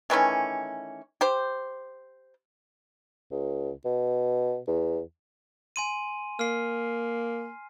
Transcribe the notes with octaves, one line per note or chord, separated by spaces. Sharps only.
D#3 E3 A3 C#4
G4 C5
C#2
B2
E2
G#5 C6 D#7
A#3 F6 C7